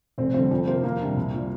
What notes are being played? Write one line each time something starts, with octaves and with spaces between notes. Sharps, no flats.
F1 C4
F2 D3 G3 C4
F2
C3 A#3 F4 C5
F2 A#3
C3 G3 D4
C2
A#2 G3